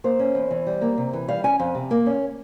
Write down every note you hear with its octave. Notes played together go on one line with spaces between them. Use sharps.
A#3 C5
C#4
E2
E3
G3
A#3
C3
E3
G3 F5
C#4 G#5
F2
C3
A#3
C#4